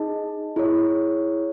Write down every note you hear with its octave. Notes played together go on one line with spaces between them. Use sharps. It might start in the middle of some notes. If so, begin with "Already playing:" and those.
Already playing: D#4 G#4 D#5 A5
E4 G#4 C#5